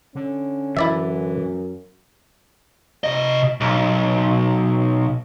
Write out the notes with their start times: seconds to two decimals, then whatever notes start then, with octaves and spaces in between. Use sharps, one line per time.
0.15 D3 C#4
0.77 F#2 E3 E4 D5 E5
3.04 C3 D#5
3.61 B1